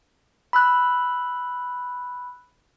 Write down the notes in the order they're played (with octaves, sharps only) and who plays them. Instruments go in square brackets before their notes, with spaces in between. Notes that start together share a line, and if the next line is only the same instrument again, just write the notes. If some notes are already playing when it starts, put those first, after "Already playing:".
[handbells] B5 E6 F#6